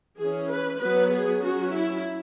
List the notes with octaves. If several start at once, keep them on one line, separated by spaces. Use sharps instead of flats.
E3 C#4 G#4
B4
F#3 B3 B4
G#4
F#3 C#4 F#4
E4